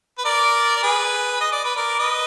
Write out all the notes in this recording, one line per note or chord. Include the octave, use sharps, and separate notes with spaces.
B4
A#4 D5
D5
G#4 B4
D#5
D5
B4
A#4 D5
B4 D#5